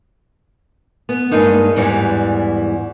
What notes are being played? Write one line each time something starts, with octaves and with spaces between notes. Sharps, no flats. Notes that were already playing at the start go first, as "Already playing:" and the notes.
B3
G2 G#3 A#3 D#4
E2 G#2 E3 G3